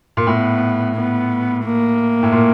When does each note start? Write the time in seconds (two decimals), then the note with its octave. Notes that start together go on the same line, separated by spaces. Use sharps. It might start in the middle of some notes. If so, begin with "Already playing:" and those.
0.17 A#2
0.27 A2 B3
0.95 B3
1.65 A#3
2.23 A2
2.32 A#2